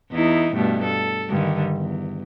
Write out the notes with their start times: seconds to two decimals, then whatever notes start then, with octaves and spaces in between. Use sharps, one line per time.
0.11 E2 D#4 E4
0.54 G2 B2 A3
0.84 A4
1.30 G2 D3 D#3
1.77 E2